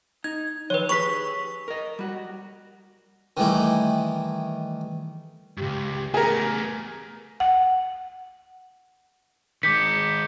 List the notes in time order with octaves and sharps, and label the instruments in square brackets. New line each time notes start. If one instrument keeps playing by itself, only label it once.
[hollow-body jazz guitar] D#4 [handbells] G#6
[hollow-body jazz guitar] D#3 F3 [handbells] B4 C#5
[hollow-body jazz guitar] G4 G#4 B4 [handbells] C#6 B6
[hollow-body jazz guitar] A#4 D#5
G3 F#4
[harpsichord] D#3 E3 G3 A3 E4
[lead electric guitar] C#2 G2 [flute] G4
[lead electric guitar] A3 B3 [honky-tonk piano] G#4 A#4
[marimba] F#5
[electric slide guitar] D#3 G#3 [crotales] D6 G6 C#7 [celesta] B6